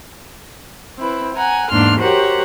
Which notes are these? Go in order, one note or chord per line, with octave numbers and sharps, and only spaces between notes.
C4 E4 B4
F#5 G#5 A#5
E2 G#2 A#3 D4 C6 F6
F#4 G4 A#4 C5 C#5 F#5